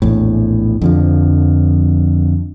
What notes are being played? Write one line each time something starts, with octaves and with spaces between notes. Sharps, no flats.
A#1 E2 A2
F2 D3 F3